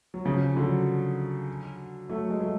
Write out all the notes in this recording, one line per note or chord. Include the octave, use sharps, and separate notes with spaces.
F#3
C#3 F3
D3 F#3
F#3 A3
G#3
F#3 A3